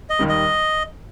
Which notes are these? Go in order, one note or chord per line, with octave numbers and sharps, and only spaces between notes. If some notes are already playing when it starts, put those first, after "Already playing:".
D#5
D#2 D#3 G3
D#5